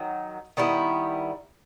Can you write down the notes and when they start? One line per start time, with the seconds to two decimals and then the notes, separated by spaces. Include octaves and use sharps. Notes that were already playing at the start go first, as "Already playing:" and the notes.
Already playing: D#3 F#3
0.57 D#3 G3 B3 E4